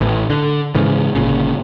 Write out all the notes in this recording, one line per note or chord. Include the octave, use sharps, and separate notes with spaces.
A1 A2 E3
D3
G#2 C#3 E3
G1 A#2 C#3